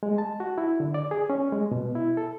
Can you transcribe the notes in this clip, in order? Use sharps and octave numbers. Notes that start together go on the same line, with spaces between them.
G#3
A5
F#4
E4
D3
D5
G#4
C#4
G#3
B2
E4
A4